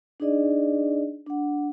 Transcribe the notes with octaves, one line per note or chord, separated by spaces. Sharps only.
D4 D#4 G#4 D5 D#5
D4 F#5